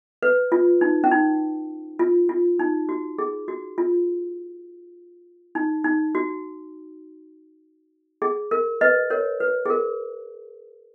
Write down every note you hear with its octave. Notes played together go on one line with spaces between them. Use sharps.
B4
F4
D#4
C#4
D#4
F4
F4
D#4
F#4
G#4
F#4
F4
D#4
D#4
F#4
G#4
A#4
B4 D#5
A#4 C#5
B4
G#4
A#4